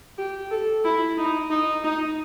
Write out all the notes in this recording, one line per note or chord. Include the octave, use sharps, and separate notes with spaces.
G4
A4
E4
D#4
D#4
D#4